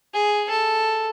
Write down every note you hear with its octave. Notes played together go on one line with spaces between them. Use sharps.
G#4
A4